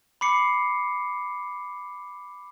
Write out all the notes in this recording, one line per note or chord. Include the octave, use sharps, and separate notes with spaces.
B5 D6 C7 C#7